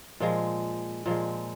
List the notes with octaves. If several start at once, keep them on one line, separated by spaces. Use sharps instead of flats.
A#2 F3 G#3
A#2 F3 G#3